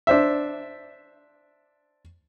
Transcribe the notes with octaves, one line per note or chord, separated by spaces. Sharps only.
D4 C5 E5